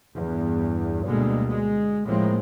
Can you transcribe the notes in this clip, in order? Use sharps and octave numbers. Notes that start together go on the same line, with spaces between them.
E2 G2
D2 B2 D3 G3 G#3 A#3
G#3
A1 A2 F3 G#3 A#3 C4